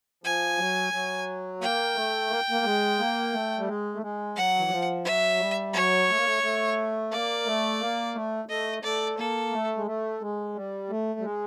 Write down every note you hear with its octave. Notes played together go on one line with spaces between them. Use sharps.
F3 G#5
F#3
F#3
A#3 G5
A3
A#3
A#3
G#3
A#3
A3
G3
G#3
A3
G#3
F#3 F#5
E3
F3
F#3 E5
G3
F#3 C#5
A3
A#3
A3
A3
A#3 D5
A3
A#3
A3
A3 D#5
A3 D5
A#3 A4
A3
G#3
A3
G#3
G3
A3
G3
G#3